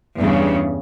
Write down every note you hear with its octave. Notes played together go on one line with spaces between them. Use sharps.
E2 G2 C#3